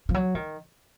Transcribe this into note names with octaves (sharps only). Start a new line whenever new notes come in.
F3
F#3
D#3